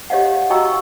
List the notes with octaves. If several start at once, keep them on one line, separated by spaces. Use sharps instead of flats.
G4 C#5 D#5 F5 F#5
F#4 D#5 G5 A#5 C#6 E6